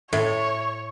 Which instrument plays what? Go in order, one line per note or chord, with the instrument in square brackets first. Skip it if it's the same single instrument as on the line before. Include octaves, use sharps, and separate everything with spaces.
[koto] A2 [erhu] C#5